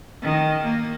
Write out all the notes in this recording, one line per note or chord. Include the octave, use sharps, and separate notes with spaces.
D#3
A#3